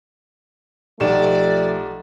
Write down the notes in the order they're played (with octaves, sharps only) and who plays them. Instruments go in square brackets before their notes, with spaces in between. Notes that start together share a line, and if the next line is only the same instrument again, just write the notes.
[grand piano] B1 E7 [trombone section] F3 A3 [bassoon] G4 [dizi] D5